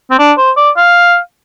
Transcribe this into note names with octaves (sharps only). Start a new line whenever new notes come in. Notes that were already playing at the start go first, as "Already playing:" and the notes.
C4
D4
C5
D5
F5